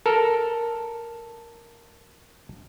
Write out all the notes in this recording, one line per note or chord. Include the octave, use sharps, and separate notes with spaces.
A4 A#4